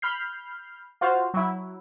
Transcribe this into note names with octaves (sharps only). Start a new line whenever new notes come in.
B5 F6 G6 C7
F4 F#4 C5 F5
F#3 E4